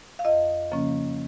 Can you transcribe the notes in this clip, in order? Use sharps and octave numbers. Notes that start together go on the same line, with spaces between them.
F5
F2 D#5
C#3 F3 A#3 C#4